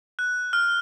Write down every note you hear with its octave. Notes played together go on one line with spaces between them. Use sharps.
F#6
F6